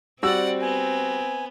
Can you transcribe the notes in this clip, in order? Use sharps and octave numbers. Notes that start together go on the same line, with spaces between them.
G3 C4 F#4 D5 F#5 E6
B3 G#5